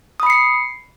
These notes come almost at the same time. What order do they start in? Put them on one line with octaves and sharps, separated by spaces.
D#6 B5 C#7 C7